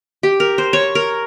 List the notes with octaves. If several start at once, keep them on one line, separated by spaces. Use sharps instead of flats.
G4
A#4
C5
C#5
A#4